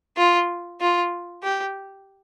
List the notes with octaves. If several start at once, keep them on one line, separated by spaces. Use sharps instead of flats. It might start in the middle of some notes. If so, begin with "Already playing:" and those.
F4
F4
G4